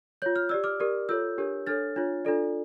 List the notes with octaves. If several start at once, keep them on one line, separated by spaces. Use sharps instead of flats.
F4 C#5 G6
F6
G4 D5 E6
D6 F6
G4 A#4 D5
F4 A4 C#5 E6 G6
D4 G4 A#4 C#5
D4 A4 C#5 F6 A6
D4 F4 C#5
D4 F4 A4 D5